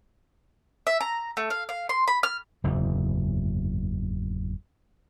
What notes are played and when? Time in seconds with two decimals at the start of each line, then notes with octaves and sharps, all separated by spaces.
0.87 E5
1.01 A#5
1.37 A3
1.50 F5
1.69 F5
1.89 C6
2.08 B5
2.23 F6
2.64 F#1 E2 G#2